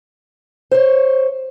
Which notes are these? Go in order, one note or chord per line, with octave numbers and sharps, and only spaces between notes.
C5 C#5